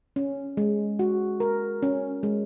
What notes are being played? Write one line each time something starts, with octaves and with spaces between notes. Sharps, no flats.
C#4
G#3
F#4
A#4
C#4
G#3